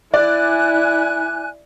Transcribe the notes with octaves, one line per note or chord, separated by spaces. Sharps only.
E4 D5 G#5 F#6